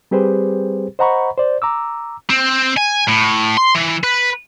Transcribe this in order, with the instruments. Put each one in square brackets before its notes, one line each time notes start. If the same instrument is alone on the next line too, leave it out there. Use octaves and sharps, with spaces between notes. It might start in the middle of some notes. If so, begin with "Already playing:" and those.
[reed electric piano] G3 C4 G4 G#4 B4 C5
C5 D#5 F#5 A#5 B5 C#6
C5 D5
A#5 D6 E6
[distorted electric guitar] C4
G#5
A2
C6
E3
B4